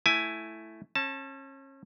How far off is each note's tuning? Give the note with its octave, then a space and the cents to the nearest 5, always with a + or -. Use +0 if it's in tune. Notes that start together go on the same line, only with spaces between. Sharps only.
A3 +0 E4 +5 G#5 +10
C#4 -35 A5 +0